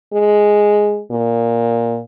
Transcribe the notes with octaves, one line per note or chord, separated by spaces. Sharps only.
G#3
A#2